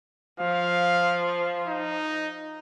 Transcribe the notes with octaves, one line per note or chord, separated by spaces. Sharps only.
F3 F5
D#4